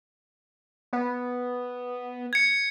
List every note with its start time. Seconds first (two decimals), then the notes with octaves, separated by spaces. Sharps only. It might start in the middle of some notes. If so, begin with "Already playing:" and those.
0.93 B3
2.33 G#6 C#7